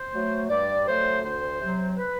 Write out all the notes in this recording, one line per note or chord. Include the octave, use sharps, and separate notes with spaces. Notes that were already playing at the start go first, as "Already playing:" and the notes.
Already playing: C5
F#3 A3
G2 D5
F#3 A3 C5
D2 C5
C3 F#3
B4